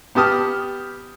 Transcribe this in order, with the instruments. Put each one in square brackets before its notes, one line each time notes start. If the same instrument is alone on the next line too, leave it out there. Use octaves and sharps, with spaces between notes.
[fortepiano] B3 G4 A5 D#6 F6